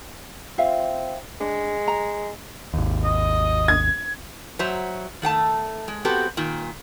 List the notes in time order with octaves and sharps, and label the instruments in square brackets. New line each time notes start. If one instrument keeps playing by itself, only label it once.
[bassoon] C4 [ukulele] F4 E5 F5
[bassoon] G#3 [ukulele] D4
[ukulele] A#5
[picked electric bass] G#1 D#2
[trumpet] D#5
[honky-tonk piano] G#6
[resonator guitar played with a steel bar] F#3 C5 E5 A#5
D#3 A3 F#5 A5
G#3
B3 C4 F#4 G4 A4
A#2 D#3